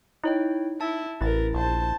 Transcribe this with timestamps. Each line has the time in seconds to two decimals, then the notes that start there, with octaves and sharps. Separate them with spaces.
0.24 D#4 E4 C#5 G5
0.81 E4 A5
1.21 A1 E4 A#4 B4 A6
1.54 A#1 C5 A5